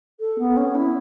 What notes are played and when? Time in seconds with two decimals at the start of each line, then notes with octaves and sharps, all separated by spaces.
0.19 A4
0.38 B3
0.56 C#4
0.75 E4